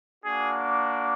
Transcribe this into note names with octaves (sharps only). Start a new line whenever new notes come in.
A#3 D4 F#4 G#4